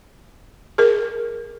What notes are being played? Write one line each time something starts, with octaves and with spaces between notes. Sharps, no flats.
G#4 A#4